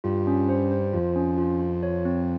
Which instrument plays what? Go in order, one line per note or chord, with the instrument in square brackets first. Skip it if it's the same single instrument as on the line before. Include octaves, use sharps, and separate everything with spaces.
[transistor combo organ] G2 [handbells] F4
[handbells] C#4
C5
C5
[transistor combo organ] F2 [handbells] F4
[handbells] C#4
F4
F4
C#5
C4